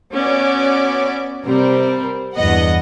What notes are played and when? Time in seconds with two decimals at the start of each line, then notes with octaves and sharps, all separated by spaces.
0.13 B3 C#4 F#4 D5
1.45 C3 G3 C4 A#4
2.35 E2 G2 B3 D#5 F#5